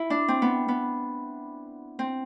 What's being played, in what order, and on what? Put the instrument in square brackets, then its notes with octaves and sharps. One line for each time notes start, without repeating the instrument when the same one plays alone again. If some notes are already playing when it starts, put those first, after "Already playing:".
Already playing: [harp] E4
D4
C4
B3
B3
C4